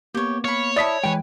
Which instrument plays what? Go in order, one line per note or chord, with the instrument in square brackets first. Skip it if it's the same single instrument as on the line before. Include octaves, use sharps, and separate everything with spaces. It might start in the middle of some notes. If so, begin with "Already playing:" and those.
[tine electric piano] A#3 B3 [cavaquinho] G4 C#5
[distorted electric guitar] C#5 [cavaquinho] F5 B5
[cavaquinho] E4 A5 [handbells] D5 D#6 B6
[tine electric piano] E3 G#3 [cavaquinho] B4 G#5 [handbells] G5